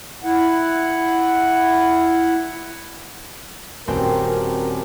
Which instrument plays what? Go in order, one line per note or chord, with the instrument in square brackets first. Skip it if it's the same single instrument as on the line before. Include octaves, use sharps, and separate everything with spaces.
[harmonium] E4 F#5
[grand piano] D#1 [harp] C4 [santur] C#4 F#4 B4 [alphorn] A#4